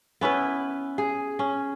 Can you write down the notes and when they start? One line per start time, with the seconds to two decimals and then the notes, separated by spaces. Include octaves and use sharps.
0.21 B3 C#4 E4 B4
0.98 G#4
1.39 C#4